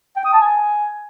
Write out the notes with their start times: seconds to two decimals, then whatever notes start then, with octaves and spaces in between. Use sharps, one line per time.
0.17 G5
0.25 D#6
0.33 A5
0.41 G#5